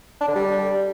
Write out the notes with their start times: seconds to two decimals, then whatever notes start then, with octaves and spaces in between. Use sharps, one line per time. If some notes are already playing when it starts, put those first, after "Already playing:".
0.20 D4
0.28 D3
0.35 G3